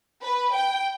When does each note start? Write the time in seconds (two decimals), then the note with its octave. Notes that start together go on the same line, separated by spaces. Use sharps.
0.23 B4
0.53 G5